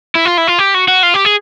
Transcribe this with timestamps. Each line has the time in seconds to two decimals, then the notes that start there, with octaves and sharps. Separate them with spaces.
0.15 E4
0.25 F4
0.37 E4
0.47 F4
0.58 G4
0.74 F#4
0.88 F#4
1.03 F4
1.14 G4
1.25 G#4